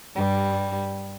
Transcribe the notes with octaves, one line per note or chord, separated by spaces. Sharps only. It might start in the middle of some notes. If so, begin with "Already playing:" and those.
G2 G3